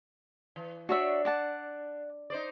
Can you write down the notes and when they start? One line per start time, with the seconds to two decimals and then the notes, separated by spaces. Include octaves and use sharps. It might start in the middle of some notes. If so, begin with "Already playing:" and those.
0.56 E3
0.89 D4 F#4 C#5 E5
1.25 D5 F#5 A5
2.30 D#4 C5 D5